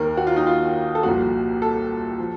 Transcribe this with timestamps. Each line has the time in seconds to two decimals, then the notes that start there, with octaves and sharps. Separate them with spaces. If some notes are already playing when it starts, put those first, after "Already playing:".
Already playing: D#2 D#3 A#4
0.17 F#4
0.27 F4
0.36 D#4
0.47 F4
0.95 A4
1.03 C2 A#2 F3 F#4
1.62 A4
2.19 F3